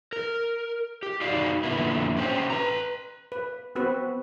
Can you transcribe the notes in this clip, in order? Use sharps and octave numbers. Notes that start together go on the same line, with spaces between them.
A#4
G4
D#4 F#4 D5 F5
F2 A#2 D3 B3 E4
C#4 F#4 C5 G5
B4 A#5
B4
B3 C4 F#4 B4